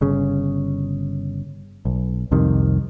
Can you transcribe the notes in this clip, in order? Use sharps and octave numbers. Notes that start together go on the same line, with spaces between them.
G1 C#3
B1
C2 F2 C3 D#3